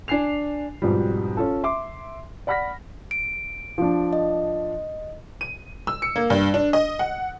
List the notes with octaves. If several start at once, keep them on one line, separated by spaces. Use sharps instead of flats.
D4 G#5 C7 F7
F2 G#2 B2 F3 G3
C#4 F4 A4
E5 C6 D6
D5 F#5 B5 F6 A#6 B6
D7
F3 D4
D#5
D#7
E6
C#7
A#3
G2
D4
D#5
F#5